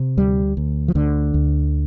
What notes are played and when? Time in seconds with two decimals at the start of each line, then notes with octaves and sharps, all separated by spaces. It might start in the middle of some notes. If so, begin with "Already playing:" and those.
Already playing: C3
0.17 D2 G3
0.57 D2
0.88 F3
0.95 D2 D3
1.34 D2